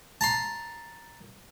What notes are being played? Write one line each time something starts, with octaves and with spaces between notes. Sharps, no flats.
A5 A#5 C6